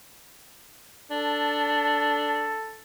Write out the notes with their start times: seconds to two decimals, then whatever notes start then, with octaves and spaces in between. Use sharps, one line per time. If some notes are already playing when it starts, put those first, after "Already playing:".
1.11 D4 A4